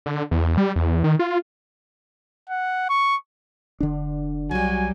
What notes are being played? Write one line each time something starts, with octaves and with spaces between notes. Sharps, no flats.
D3
E2
G3
E2
D#3
F4
F#5
C#6
F1 D3 D4
B1 F#3 G3 F#4 G#5